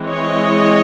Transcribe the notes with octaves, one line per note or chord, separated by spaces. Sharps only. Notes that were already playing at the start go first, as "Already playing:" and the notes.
Already playing: E3 G#3 C4
C#5 D#5